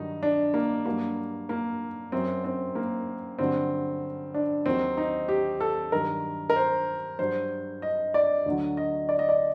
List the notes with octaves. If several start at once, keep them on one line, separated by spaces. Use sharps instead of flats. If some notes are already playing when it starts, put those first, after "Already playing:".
Already playing: G2 D#3 F#3 D#4
D4
A#3
G2 F#3 A#3
A#3
F#2 F#3 C4
C4
A#3
G2 D3 F#3 C4
D4
D#2 D#3 F#3 C4
D#4
G4
A4
G2 D#3 F#3 A#4
A#4
C5
G2 F#3 C5
D#5
D5
D2 D3 F#3
D#5
D5
D#5
D5